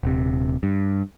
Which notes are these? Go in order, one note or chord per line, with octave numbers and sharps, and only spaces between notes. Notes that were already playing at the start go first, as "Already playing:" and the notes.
D#1 C3
G2